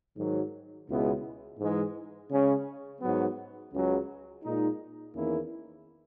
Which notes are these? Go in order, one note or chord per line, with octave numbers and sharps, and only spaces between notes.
G#2 D#3 F#3
C#2 B2 G#3 B3 E4
G#2 E3 G#3
C#3 G#3 C#4
G#2 F#3 B3
C#2 C#3 F#3
A#2 G#3 D#4
E2 D#3 A#3 C#4 E4